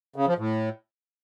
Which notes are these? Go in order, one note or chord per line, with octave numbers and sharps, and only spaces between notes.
C#3
F3
A2